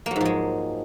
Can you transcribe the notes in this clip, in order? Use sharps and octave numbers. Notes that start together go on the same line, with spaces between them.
G#2 F3 F#3 G#3 A#3